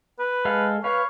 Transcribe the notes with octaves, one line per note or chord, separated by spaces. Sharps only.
B4
G#3 A4 F5
B4 C#5 F5